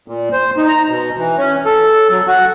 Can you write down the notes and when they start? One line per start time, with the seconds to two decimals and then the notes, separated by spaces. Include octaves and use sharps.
0.08 A#2
0.33 C5
0.57 D#4
0.68 A#5
0.89 B2
1.18 E3
1.37 C#4
1.65 A4
2.11 F#3
2.27 F#4